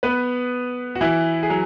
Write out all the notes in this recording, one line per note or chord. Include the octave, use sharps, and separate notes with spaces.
B3 B4
F#4
E3 E4
G#4
F#3